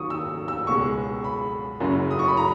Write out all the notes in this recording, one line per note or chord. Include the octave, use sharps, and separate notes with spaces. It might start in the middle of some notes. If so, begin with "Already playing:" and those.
Already playing: D#2 D#3 F#3 C#6 D#6
E6
E6
C#2 B2 G#3 C#6
B5
F#1 F#2 C#3 F#3
D#6
C#6
B5
A#5